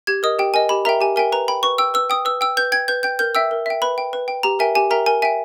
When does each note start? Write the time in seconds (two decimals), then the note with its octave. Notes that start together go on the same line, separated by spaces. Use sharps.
0.07 G4 G#6
0.23 A#4 D#5 D#6
0.39 G4 G5
0.54 A#4 D#5 G#5
0.69 G4 B5
0.85 A#4 E5 G5 A#5
1.01 G4 G#5
1.16 A#4 E5 G5 G#5
1.32 B4 A#5
1.48 G5 B5
1.63 B4 C#6
1.78 G5 E6
1.94 B4 E6
2.10 G5 D#6
2.25 B4 E6
2.41 G5 E6
2.57 B4 G6
2.72 G5 G#6
2.88 B4 G6
3.03 G5 G6
3.19 A#4 G6
3.35 E5 G5 E6
3.51 A#4
3.66 E5 G5
3.82 B4 B5
3.98 G5
4.13 B4
4.28 G5
4.43 G4 A#5
4.59 A#4 E5 G5 G#5
4.75 G4 G#5
4.90 A#4 E5 G5 A#5
5.06 A#4 G#5
5.22 E5 G5 G#5